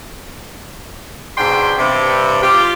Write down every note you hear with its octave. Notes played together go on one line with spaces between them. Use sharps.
G#2 B2 D4 G5 C6
G2 C3
F4 G4